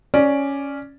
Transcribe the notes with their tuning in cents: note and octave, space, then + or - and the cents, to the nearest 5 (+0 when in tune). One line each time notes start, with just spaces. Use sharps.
C#4 +0 D5 +0